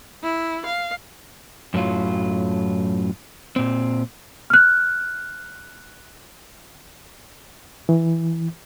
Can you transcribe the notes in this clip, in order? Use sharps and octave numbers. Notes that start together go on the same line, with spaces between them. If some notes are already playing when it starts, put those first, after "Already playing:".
E4
F5
F#2 A2 F#3 F4
A#2 C4
F6 F#6
E3